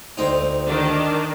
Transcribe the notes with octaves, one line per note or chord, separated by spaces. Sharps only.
D2 C4 D#4
D#3 D4